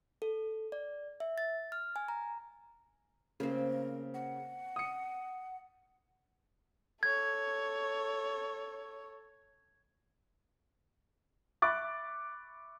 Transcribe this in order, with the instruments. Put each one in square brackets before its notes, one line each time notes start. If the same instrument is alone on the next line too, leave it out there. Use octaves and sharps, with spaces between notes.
[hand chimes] A4
D5
E5
A6
F6
G#5
A#5
[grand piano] C#3 [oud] A#3 C4 [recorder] A#4
[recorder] F#5
[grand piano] D#6 C#7
[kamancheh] A4 C#5 [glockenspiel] G#6
[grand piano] E5 B5 C#6 D6 F#6 A6